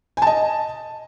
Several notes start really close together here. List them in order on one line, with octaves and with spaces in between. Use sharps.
G#5 A5 D#5